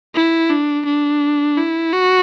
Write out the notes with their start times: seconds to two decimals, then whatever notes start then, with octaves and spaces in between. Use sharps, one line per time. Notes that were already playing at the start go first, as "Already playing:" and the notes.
0.15 E4
0.50 D4
0.86 D4
1.57 E4
1.92 F#4